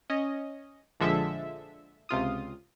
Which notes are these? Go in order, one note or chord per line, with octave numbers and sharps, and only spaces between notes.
C#4 D#5
A#1 D3 F3 G#3 A4 E5
C#2 C3 F4 D#6